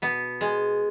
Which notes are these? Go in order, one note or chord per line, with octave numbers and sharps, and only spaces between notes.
B2 B3
G#3